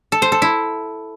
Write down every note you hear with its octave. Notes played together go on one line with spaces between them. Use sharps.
A4
C5
A4
E4